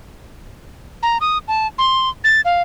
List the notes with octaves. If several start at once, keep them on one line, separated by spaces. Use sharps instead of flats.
A#5
D#6
A5
C6
A6
F5